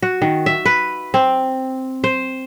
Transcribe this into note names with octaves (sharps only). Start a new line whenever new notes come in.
F#4
D#3
E5
B4
C4
C5